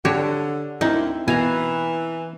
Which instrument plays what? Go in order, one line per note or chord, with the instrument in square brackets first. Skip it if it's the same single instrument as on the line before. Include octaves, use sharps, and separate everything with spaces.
[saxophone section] D3 [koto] F#4 G4 C#5
[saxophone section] D2 A#3 [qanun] C4 E4 [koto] D#4
[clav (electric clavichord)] B2 [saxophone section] E3 [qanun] A#4 F5 A#5 [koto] G#5